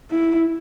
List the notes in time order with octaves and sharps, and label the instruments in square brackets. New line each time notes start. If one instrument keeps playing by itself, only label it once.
[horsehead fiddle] E4